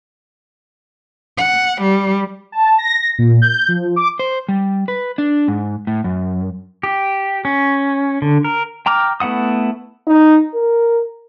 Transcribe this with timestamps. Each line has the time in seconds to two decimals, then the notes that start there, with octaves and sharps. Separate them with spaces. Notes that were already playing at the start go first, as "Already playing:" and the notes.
1.38 F#5
1.82 G3
2.52 A5
2.78 A#6
3.19 A#2
3.42 G6
3.68 F3
3.96 D6
4.19 C5
4.49 G3
4.88 B4
5.18 D4
5.48 G#2
5.87 A2
6.04 F#2
6.83 G4
7.45 C#4
8.22 D3
8.44 A#4
8.86 G5 A#5 D6 F6
9.20 A3 B3 E4 F#5 D#6
10.07 D#4
10.54 A#4